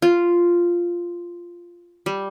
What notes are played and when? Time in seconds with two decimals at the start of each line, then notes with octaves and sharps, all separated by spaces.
0.02 F4
2.06 G3